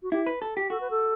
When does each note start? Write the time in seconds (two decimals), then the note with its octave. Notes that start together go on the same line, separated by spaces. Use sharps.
0.03 F#4
0.12 E4 G4
0.26 B4
0.42 A4
0.57 G4
0.70 F#4 A4
0.80 B4
0.91 A4